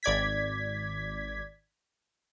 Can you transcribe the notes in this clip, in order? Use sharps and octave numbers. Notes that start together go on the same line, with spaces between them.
G#1 D5 G#6 B6